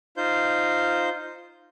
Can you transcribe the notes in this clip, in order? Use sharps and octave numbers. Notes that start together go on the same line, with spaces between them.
D#4 F4 C5 G6